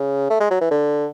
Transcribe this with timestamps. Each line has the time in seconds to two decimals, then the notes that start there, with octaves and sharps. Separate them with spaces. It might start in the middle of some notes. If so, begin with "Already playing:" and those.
Already playing: C#3
0.30 A3
0.40 G#3
0.51 F#3
0.61 E3
0.71 D3